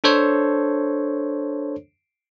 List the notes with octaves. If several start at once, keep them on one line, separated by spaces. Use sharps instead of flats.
D4 A4 C5 C#5